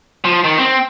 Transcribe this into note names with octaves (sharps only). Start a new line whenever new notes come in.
F3
D#3
C4